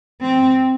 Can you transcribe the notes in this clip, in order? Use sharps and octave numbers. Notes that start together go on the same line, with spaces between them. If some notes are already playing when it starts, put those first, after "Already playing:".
C4